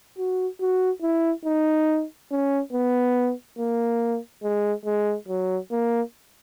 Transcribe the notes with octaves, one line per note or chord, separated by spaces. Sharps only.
F#4
F#4
E4
D#4
C#4
B3
A#3
G#3
G#3
F#3
A#3